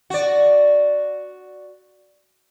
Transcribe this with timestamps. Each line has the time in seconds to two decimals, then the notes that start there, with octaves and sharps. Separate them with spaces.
0.10 F#4 D5